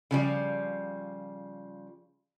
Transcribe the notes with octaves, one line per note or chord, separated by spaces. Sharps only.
C#3 F3 G3